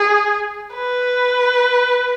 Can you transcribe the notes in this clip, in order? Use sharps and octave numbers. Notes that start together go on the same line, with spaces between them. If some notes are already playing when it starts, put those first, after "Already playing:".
Already playing: G#4
B4